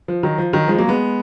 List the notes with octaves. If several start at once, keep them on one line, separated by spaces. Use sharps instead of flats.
F3
D#3 F#3
F3
D#3 F#3
F3 G#3
F#3 A#3
G#3 B3